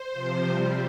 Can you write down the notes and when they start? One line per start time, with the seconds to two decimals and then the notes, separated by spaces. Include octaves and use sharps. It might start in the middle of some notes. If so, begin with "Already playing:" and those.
Already playing: C5
0.13 C3 F3
0.46 C3 G3